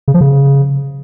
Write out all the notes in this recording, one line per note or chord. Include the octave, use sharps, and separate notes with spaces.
C#3
F3
C#3